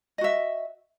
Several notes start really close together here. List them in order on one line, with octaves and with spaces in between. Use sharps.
D#5 F#4 E5